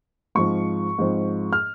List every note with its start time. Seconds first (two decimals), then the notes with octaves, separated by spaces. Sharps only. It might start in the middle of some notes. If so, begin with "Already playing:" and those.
0.35 G#2 F3 C4 C#6
0.99 G#2 F3 C4
1.53 F6